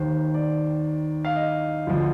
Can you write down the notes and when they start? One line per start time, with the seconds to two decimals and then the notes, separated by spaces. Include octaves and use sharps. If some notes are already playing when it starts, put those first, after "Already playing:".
Already playing: D#2 D#3 C5
0.34 D5
1.25 F5
1.36 D#5
1.87 D2 D3 F3